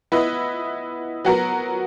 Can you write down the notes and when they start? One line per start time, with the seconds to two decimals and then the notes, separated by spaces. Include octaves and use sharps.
0.12 B3 E4 B4 D#5
1.25 F#3 B3 F#4 A#4